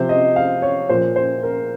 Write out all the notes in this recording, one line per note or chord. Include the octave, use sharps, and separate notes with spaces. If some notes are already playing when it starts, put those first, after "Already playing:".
Already playing: C3 F3 C5
D#5
F5
C#5
A#2 F3 C5
C5
A#4